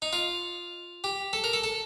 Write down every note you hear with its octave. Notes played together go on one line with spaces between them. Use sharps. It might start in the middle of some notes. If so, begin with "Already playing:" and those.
D#4
F4
G4
A4
A#4
A4
A4